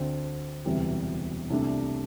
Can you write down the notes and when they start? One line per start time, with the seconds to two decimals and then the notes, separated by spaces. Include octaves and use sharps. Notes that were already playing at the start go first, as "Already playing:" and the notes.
Already playing: D2 D3 C4
0.65 E1 D2 C3 E3 G3
1.50 C2 C3 A3 D4